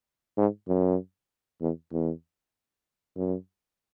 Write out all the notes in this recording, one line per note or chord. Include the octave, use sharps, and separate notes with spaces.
G#2
F#2
E2
E2
F#2